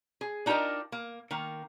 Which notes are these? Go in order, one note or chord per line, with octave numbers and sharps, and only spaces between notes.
G#4
D4 D#4 F4 G4 A#4 D#5
A#3
D#3 A#3